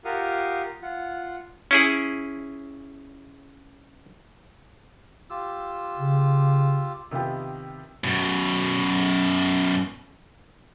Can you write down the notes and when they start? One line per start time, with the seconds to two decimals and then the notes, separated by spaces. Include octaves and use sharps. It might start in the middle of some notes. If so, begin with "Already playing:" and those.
0.05 F4 G4 A#4 F5 F#5 D#6
0.82 F4 F#5
1.71 C#4 E4 G#4
5.30 F4 G4 E6
5.98 C#3
7.11 C3 D#3 B3 F4 G4
8.04 F#2 B2